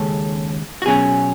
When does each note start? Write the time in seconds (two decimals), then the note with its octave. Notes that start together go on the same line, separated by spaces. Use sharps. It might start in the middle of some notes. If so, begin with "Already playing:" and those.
Already playing: D#2 C#3 G#3 C#4 A4
0.82 F#4
0.86 B2 F#3 C#4 G#4